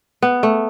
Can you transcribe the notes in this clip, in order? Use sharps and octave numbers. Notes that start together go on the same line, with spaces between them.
B3
A3